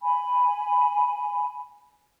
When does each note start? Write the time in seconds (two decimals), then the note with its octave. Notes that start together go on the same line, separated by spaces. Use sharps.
0.01 G#5 B5